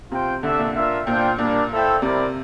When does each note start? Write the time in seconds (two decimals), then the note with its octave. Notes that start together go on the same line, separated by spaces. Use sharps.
0.11 C3 F4 C5 G5
0.43 D3 A3 D4 A4 E5
0.59 A#2
0.75 D4 F4 A#4 E5
1.07 A#2 D4 F4 C5 G5
1.38 A#2 G3 A#3 D4
1.71 E4 A4 C5 E5 G5
2.02 C3 G3 C4 E4 A#4 D5